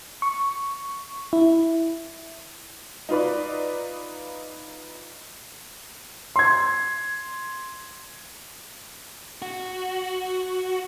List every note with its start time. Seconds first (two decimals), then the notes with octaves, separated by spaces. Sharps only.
0.22 C#6
1.33 E4
3.09 D#4 F4 B4 D5
6.36 C6 G#6
9.42 F#4